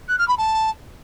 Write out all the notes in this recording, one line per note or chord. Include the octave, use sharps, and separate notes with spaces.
F#6
F6
B5
A5